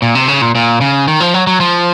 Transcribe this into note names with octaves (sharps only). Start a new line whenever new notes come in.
A#2
C3
C#3
A#2
A#2
C#3
D#3
F3
F#3
F#3
F3